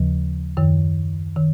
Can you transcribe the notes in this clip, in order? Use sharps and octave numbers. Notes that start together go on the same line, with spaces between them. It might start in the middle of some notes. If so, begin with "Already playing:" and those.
Already playing: D#2 C#3 F3
F#2 D#3
D#3